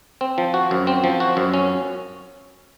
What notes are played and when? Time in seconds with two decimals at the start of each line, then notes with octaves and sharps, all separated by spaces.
0.21 C4
0.38 F3
0.54 F#4
0.71 F#2
0.87 C4
1.04 F3
1.20 F#4
1.37 F#2
1.54 C#4